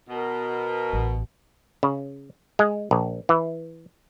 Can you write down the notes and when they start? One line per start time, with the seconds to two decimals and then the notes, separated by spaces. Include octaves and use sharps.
0.09 B2 A#4
0.93 A1
1.83 C#3
2.59 G#3
2.91 A#1
3.29 E3